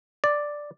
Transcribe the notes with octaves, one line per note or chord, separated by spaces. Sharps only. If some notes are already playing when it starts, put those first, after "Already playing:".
D5